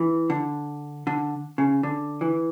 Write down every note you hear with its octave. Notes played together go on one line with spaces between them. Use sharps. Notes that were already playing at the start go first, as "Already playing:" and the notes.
Already playing: E3
D3
D3
C#3
D3
E3